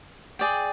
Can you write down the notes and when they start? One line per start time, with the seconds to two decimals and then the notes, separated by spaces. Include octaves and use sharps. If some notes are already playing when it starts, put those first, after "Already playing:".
0.39 G#4 D5 G5